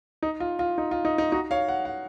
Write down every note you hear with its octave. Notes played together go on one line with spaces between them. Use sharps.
D#4
F4
F4
D#4
F4
D#4
D#4
D#4 F#4
C#5 F5
F#5
F#5